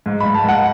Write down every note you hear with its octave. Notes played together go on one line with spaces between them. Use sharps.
G#2
B5
G#2
A5
G#2 F#5